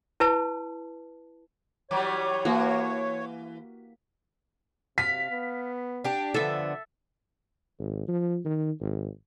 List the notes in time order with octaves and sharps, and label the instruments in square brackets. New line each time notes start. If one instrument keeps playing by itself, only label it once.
[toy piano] E4 B4 A5
[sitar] E3 F#3 G3 [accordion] C#5
[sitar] E3 [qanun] A#3 F#4
[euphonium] C3 [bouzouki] F5 [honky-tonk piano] B6
[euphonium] B3
[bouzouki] D4 G4
[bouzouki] D3 B3 [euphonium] F3 [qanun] A4 E5
[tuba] G#1
F3
D#3
G#1